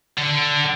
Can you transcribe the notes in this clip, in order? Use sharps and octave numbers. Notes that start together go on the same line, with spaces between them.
D3